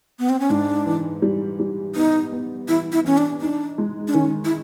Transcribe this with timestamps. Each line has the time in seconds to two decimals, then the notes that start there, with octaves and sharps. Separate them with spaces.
0.19 B3
0.29 C4
0.40 C#4
0.50 G#2 D4
0.86 E3
1.22 G3
1.60 G3
1.95 B3 D#4
2.32 B3
2.68 E3 E4
2.92 E4
3.04 E3 C#4
3.18 D4
3.41 D4 D#4
3.78 G#3
4.08 D4
4.14 D#3 C#4
4.45 E4